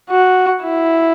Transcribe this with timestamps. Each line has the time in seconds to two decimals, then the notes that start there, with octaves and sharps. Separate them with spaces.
0.11 F#4
0.63 E4